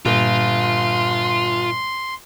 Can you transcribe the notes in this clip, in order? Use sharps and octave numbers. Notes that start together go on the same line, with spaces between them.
G1 A#2 F4 C6